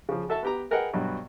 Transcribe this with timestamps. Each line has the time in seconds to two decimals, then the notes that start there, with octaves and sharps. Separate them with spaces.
0.09 C#3 F3
0.29 F#4 A4 E5 A5
0.43 B3 G4 A#5
0.71 G#4 A#4 B4 D#5 F#5 G5
0.93 G2 B2 F#3